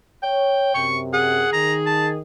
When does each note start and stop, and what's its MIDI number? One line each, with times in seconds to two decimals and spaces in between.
0.23 0.74 73
0.23 0.88 79
0.74 1.45 42
0.74 1.45 48
0.74 0.98 85
1.13 2.20 68
1.13 1.51 78
1.53 2.21 51
1.53 1.74 82
1.86 2.08 81